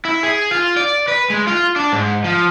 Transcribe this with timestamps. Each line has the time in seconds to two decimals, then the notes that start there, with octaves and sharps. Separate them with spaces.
0.05 E4
0.23 G#4
0.51 F4
0.76 D5
1.08 B4
1.30 G#3
1.47 F4
1.76 D4
1.92 G#2
2.24 F3